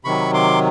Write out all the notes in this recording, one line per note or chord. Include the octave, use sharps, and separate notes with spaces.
C3 D#3 F#3 B5 C#6
C6 D6